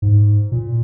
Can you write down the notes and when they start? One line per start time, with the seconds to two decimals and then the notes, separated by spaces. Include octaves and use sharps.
0.02 G#2
0.52 A#2